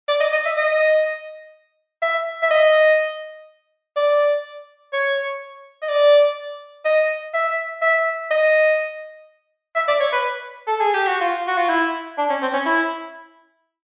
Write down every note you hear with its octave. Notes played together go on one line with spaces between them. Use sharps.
D5
D#5
D#5
E5
D#5
E5
E5
D#5
D5
C#5
D#5
D5
D#5
E5
E5
D#5
E5
D5
C#5
B4
A4
G#4
G4
F#4
F4
F#4
F4
E4
D4
C#4
C4
C#4
E4